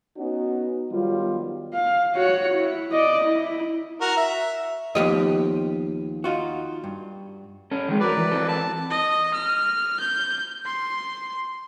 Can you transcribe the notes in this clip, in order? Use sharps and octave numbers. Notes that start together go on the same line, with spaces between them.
B3 C#4 D#4 F#4
D#3 F#3 G3 B3 F4
F5
F#4 C#5
E4
D5 D#5
E4
F#4 A#4
E5
D#2 F3 B3 G4 D#5
D#4 F4 F#4
G2
C#4 A4
D#3 G#3
F#3 A#4 B4 D5
E3
E3 C4 A4
A5
D#5
F6
G6
C6